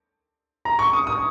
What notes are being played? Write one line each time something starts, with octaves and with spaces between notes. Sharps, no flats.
A#5
C#6
D#6
D#6